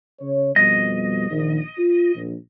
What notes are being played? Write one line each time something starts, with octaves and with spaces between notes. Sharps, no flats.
C#3 C#5
F2 B2 G3 D#5
A#1 D#3
F4
A#1